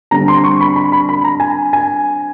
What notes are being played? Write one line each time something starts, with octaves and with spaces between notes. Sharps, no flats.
D3 G3 C4 A#5
C6
C#6
B5
B5
B5
B5
A#5
G#5
G#5